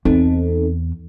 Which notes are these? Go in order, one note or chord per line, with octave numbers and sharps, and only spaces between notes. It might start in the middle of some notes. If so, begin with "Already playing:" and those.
E2 C4 D#4 A4